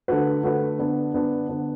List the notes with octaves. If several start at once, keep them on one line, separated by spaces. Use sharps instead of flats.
D3 A3 F#4 B4
D3 A3 F#4 B4
D3 B3 D4
D3 B3 D4
D3 B3 D4